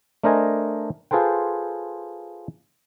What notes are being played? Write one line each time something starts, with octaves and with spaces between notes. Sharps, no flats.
A3 D4 A#4 C5 D#5 G#5
F4 G#4 A4 B4 C5 G5